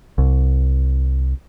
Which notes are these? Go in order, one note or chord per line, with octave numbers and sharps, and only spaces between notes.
C2